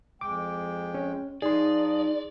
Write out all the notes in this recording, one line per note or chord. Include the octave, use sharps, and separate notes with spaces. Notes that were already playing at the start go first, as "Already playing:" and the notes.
F2 G#3 G5 D6
C#4
F3 D#4 G#4 D5 D#5 C6